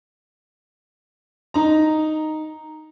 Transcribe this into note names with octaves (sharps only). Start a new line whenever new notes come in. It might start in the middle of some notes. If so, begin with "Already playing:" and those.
D#4 A#5